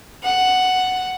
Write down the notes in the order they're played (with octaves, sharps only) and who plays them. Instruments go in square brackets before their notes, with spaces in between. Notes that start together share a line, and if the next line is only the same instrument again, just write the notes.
[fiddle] F#5